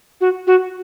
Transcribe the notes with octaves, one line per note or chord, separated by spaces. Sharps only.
F#4
F#4